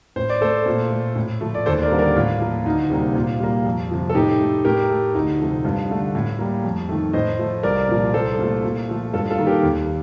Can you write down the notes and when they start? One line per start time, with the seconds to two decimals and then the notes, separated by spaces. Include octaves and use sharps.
0.16 A2 C5
0.29 D5
0.41 A3 A4 C5
0.66 A#2
0.91 A3
1.16 A2
1.41 F3 A3
1.55 D5
1.66 D#2 A4 C5
1.83 A#4 D5
1.90 D3 G3 A#3
1.99 A#4 D5
2.16 A2 F4
2.41 F3 A#3
2.65 D2 D#4
2.90 C3 G3 A#3
3.15 A#2 F4
3.40 G3 A#3
3.66 F2
3.91 C3 F3
4.09 A4
4.15 A2 D#4 G4
4.40 A3
4.65 A2 G4 A#4
4.90 A3
5.15 D2 D#4
5.40 C3 F3 A3
5.65 G2 F4
5.89 D3 A3
6.15 A2
6.39 G3 A#3
6.64 F2
6.89 D#3 A3
7.13 A2 C5 D#5
7.39 F3 A3
7.63 C2 A#4 D5
7.89 A#2 F3
8.14 C2 A4 C5
8.39 A#2 A3
8.63 A#2
8.89 F3 A3
9.13 G2 F4 A4
9.30 F4 A4
9.38 D#3 A#3
9.47 G4 A#4
9.63 D#2